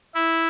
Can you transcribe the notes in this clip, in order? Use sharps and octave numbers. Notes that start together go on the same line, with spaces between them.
E4